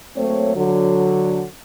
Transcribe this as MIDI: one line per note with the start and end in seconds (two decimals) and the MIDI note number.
0.17 0.53 54
0.17 0.53 57
0.17 0.53 58
0.17 0.53 60
0.17 0.53 73
0.56 1.44 50
0.56 1.44 54